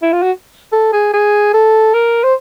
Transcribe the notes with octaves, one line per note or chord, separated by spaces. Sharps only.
E4
F4
F#4
A4
G#4
G#4
A4
A#4
C5